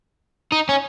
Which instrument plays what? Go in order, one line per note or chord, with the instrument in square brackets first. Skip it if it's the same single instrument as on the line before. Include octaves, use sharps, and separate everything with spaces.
[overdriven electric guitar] D#4
C#4